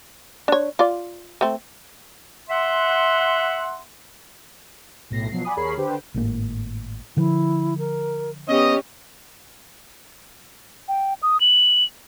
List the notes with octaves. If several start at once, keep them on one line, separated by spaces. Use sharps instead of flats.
D4 C#5
F4 D5
A3 C4
E5 F#5 C6
B1 A2 A#6 C7
B2 F3 F#3 C7
D5 F#5 G#5 B5 D#6
D#2 G#4 A#4 C#5 B5 C7
D3 G4 B4 C5
G#1 A2 A#3
D3 F3 E4
A#4
B3 C#4 G4 D#5
G5
D#6
F#7